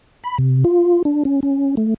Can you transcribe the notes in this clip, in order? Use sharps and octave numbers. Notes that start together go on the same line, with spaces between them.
B5
C3
F4
D4
C#4
C#4
A3